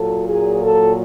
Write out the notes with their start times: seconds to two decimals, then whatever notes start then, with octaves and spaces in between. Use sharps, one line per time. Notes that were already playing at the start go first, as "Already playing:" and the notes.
Already playing: A#2 F#3 A4
0.28 G#4
0.63 A4